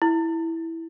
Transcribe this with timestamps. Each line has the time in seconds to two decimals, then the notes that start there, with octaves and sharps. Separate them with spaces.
0.02 E4